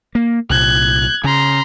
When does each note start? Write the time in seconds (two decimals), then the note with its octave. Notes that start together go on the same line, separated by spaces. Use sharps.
0.15 A#3
0.50 C2 A#2 F#6 G#6
1.24 C#3 A#5 C6